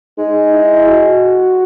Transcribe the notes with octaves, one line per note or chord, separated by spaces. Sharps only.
G#3 D#4
E4
F#4